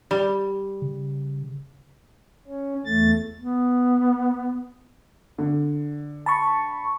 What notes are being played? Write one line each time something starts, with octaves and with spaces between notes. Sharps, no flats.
G3
C#3
C#4
E2 A3 A6
B3
D3
A5 B5 C#6